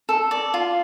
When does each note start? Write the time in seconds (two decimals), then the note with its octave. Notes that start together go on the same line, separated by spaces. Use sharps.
0.09 A4
0.31 D5
0.54 F4